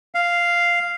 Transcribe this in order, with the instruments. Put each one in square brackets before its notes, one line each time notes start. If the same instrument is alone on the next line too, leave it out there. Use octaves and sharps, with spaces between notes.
[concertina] F5